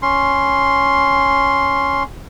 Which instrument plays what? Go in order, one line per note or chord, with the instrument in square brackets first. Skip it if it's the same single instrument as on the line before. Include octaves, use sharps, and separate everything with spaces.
[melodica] C#4 C6